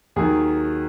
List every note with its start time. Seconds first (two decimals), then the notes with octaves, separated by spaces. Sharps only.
0.16 D#2 D#3 F#3 G#4